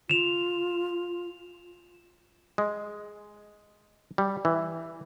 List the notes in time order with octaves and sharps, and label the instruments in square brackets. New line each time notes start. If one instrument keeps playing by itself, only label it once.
[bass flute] F4 [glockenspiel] E7 F7
[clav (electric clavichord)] G#3
G3
E3